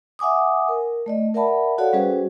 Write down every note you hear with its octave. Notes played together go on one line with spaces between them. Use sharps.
E5 F#5 G#5 D6 D#6
A#4
A3 D5 D#5
A#4 D5 E5 F#5 A5 B5
F#4 A4 C#5 D5 F5 F#5
G3 C#4 F#4 G#4 B4 C5